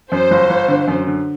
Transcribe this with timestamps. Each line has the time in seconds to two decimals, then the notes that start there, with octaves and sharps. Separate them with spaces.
0.12 F#2 C5
0.31 G1
0.50 G1
0.68 D3
0.88 F#2
1.07 D3